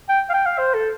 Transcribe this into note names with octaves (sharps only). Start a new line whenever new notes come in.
G5
F5
G5
F5
C5
A4